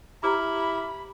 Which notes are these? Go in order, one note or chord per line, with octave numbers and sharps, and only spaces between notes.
E4 G4 C5 A#5 B5 D6 F6